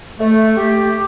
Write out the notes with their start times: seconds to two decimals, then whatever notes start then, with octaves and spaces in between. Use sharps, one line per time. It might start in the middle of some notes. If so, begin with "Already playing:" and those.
0.20 A3
0.57 G4